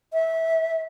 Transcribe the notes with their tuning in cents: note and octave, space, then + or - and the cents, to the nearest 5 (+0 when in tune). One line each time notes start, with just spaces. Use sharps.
E5 -20